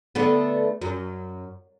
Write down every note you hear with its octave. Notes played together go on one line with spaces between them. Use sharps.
D3 A3 B3
F#2